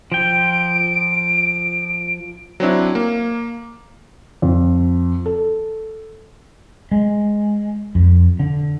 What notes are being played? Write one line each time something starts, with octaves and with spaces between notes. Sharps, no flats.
F3 G5 D7
F#3 C4 D4 E4
A#3
F2
A4
G#3
F2
D3